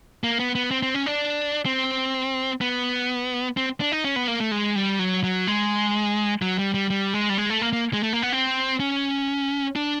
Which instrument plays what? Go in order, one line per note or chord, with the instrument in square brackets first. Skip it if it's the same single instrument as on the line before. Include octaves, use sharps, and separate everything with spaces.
[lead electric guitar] A#3
B3
B3
C4
C4
C#4
D4
C4
B3
C4
D4
D#4
C#4
B3
A#3
A3
G#3
G3
F#3
F#3
G#3
F#3
G3
G3
G3
G#3
G3
G#3
A3
A#3
A#3
G#3
A3
A#3
B3
C4
C#4
D4